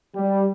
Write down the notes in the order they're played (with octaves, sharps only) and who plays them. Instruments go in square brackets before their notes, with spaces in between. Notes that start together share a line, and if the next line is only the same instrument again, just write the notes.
[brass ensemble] G3